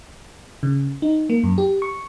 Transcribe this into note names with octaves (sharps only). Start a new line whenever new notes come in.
C#3
D#4
A#3
F#2
G4
C#6